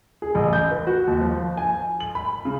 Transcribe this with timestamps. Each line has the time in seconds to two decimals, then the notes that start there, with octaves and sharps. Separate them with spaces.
0.22 G#4
0.35 A1
0.53 G6
0.71 B4
0.87 F#4
1.07 D#2
1.21 F3
1.57 G#5
2.00 F#7
2.15 B5
2.45 C#3